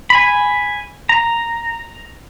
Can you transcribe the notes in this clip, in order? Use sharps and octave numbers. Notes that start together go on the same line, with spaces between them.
G#5 B5
A#5